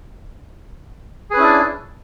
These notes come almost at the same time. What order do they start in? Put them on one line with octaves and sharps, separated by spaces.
G#4 B4 C#4 E4 D4